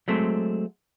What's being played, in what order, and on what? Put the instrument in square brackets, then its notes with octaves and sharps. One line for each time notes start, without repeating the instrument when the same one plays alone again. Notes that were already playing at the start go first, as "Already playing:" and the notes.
[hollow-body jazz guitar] F#3 G#3 A3 C4